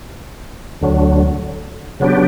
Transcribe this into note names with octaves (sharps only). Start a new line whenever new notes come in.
D2 D3 F#3
C#3 F#3 B3 D4 G4